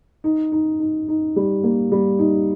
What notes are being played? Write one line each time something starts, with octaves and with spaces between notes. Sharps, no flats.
D#4
D#4
D#4
D#4
G3
A#3
G3
D#4